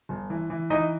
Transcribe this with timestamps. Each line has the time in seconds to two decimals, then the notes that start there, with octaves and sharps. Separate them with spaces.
0.09 G1
0.30 E3
0.50 E3
0.70 E3 D#4 D#5